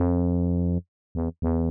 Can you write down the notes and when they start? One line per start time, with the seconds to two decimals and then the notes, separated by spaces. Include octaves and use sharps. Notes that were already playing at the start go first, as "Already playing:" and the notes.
Already playing: F2
1.15 E2
1.42 E2